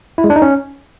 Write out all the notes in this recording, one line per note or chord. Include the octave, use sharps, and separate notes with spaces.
E4
G#3
D4
D#4
C#4